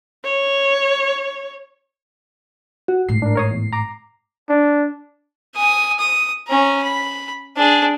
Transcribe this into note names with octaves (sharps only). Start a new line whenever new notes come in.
C#5
F#4
G#1 A2 C7
D4 A#4
A#4 C#5 D#6
E2
A#5 D6
D4
G#5 D#6
D#6
C#4 A#5
B5
D4 G#4